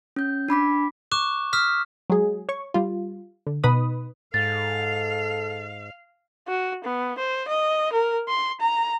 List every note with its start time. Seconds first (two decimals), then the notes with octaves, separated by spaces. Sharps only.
0.16 C#4 G6
0.48 D4 B5 D6 B6
1.12 C#6 D6 F#6 E7
1.53 D#6 F6 B6
2.10 F#3 G#3 G#4
2.49 C#5 C#6
2.74 G3 F4
3.47 D3
3.64 B2 D#4 B4 B5 D#6
4.34 G#2 A4 F5 A6
6.48 F#4
6.84 B3
7.18 C5
7.48 D#5
7.93 A#4
8.29 C6
8.61 A#5